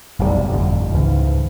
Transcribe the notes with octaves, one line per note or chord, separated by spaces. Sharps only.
F1 B1 G#2 G3
G1 F2 A2
C#2 G#2 E3